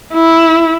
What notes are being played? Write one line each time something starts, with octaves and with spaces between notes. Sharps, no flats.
E4